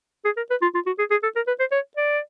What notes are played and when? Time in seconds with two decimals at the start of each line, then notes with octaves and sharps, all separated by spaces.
0.25 G#4
0.37 A#4
0.50 B4
0.62 F4
0.74 F4
0.86 F#4
0.98 G#4
1.11 G#4
1.23 A4
1.35 A#4
1.47 B4
1.59 C5
1.71 C#5
1.97 D5